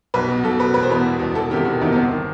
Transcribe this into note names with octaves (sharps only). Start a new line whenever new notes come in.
B1 B4
B2
B1 A4
B2 B4
E1 B4
C5
E2 B2 B4
E1
E2 B2
E1 A4
E2 C3 D#3 G4
E1 F#4
E2 C3 D#3 D#4
B3
G1 C4
D#3